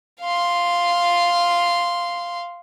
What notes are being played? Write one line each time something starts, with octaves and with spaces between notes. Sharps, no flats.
F5 C6